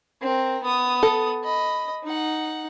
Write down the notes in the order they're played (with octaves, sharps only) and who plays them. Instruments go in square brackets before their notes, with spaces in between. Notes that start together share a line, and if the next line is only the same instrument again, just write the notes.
[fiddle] C4 A#4
B3 D#6
[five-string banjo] A4
[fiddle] D#5 B5
D#4 F#5